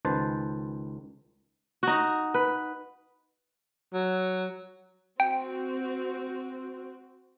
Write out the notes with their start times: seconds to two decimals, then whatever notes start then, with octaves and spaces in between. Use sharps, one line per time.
0.05 C#2 D#3 B4 C5 A5
1.83 D#4 F#4
2.34 B4
3.93 F#3
5.20 C4 F#4 G5